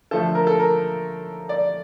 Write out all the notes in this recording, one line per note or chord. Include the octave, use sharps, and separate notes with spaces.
D3 F3 A3 A4
A#4
A4
A#4
D5